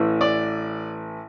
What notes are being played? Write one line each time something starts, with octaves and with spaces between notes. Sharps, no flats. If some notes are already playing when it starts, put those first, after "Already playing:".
Already playing: A1 A2 E3
D5